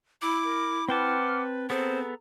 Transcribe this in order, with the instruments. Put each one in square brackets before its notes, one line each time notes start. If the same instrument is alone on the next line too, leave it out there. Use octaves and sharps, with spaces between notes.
[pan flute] E4 [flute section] B5 E6 [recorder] D6
[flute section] A#4
[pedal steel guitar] C4 G5 A5 [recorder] B4 [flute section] F#5 D6 F6
[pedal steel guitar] B3 G#4 A4 [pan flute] C4 [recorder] C5 [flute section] A#5